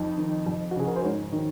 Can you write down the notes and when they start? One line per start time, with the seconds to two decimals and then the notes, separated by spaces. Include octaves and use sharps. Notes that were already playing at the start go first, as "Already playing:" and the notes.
Already playing: F2 D#4
0.18 D#3
0.47 F2
0.71 F#4
0.76 C#3 G#4
0.87 A#4
0.96 C5
1.04 G#2 C#5
1.32 D#3